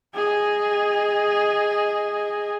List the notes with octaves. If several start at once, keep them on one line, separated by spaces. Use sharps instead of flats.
G#4 D#5